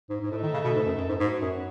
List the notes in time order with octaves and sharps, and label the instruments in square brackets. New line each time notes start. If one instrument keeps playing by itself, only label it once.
[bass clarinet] G#2
G#2
[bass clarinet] A2 [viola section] A3 D#4 A4 E5
[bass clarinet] D#3
C#3
B2
G#2
F#2
F#2
G#2
[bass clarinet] G#2 [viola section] F#3 B3 F#4 C#5
[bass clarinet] F#2